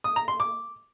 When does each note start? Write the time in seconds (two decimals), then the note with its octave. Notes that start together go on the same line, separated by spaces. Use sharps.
0.04 D#6
0.16 A#5
0.28 C6
0.40 D6